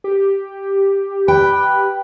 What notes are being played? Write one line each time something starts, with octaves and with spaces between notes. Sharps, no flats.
G4
B4 G5